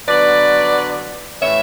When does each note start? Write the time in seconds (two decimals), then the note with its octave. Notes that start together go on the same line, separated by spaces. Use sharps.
0.07 D3 F#3 B3 B4 D5
1.40 A2 E3 A3 C#5 E5